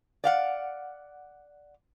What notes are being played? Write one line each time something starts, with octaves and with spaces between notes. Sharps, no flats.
D5 F5 F#5